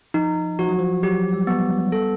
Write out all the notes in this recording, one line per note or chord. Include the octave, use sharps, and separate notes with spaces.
F3 D#4
F3 F#4
F#3
F3
F#3 G4
G3
B3
G3
G#3
G3 A4